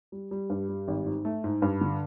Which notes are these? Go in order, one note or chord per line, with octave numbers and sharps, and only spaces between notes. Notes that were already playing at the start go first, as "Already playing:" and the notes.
G3
G3
G2
G3
G#1
G#2
A3
G#2
G2
D3